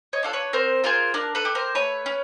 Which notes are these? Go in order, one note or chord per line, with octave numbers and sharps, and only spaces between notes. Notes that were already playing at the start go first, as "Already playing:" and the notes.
C#5 D#5
D4 F4 A4
B4 C#5
C4 A#4 C5
F4 G#4 A#4 C5
D4 A#4
A4 B4
G4
A#4 C5
A3 B4 C#5
C#4